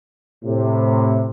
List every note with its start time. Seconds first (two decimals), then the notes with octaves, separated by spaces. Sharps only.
0.44 A2 C3